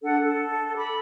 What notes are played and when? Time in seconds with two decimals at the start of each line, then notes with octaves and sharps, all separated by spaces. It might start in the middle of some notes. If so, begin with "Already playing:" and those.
0.02 D4 A4 F#5
0.23 A4
0.76 B5 D6